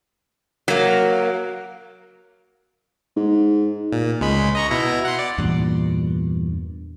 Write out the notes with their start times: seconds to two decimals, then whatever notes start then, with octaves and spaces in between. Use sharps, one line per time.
0.68 F#3 A#3
3.16 G#2
3.92 A#2
4.21 C#2 G#3 B5
4.55 D#5 A#5 C#6
4.71 B2 E4 A#5
5.05 F#5 C6
5.19 D5
5.38 E2 G2 A#2